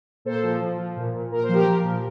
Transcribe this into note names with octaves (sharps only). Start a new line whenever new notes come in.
A#2 A4 C5
F3
F3
F3
A#2
A#2
A#2 A#4
C5
F3 G4 A#4
F3
A#2